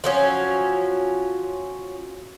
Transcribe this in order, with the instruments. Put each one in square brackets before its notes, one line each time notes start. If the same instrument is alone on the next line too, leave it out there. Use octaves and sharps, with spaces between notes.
[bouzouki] F3 F#3 C#4